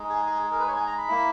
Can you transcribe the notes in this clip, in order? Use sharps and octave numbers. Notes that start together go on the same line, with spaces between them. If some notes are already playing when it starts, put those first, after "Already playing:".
Already playing: G#3 D#4
G#4
G#4
G#4
A#4
B4
C#5
G#5
A#5
B5
A#3 E4